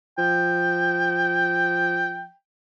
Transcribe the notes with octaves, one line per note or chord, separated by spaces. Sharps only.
F3 G5